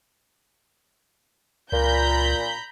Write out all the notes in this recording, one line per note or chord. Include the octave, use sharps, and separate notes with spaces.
C#2 A#2 A#5 B5 G6